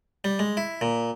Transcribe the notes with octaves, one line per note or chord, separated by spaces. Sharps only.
G3
G#3
E4
A#2